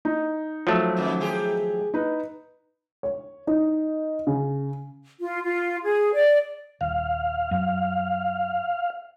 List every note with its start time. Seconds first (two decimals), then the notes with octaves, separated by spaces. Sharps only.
0.05 D#4
0.67 F3 F#3 A3
0.96 F2 D#3 E3
1.20 D#3 G4 G#4
1.94 D#4 B4
3.03 C#5
3.47 D#4
4.27 C#3
5.20 F4
5.42 F4
5.84 G#4
6.14 D5
6.81 D#1 F5
7.51 F#2